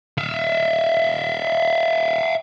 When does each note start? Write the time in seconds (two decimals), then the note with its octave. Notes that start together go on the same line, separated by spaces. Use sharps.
0.18 E5 F5